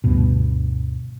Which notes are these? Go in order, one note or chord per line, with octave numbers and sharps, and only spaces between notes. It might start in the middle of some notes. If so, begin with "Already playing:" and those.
D2 G2 B2